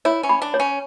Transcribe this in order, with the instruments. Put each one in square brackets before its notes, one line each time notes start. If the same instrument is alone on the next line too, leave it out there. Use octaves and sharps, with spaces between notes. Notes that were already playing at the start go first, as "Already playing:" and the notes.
[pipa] E4 [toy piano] C#5
[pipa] C#4
[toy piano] B5
[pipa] D4
[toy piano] C#5
[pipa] C#4